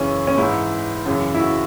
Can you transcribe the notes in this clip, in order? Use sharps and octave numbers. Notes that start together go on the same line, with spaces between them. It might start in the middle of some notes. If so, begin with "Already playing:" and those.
Already playing: F#2 C#3 E3 C#4
C#4
G#2 E3 E4
F#2 C#3 E3
E4
F#4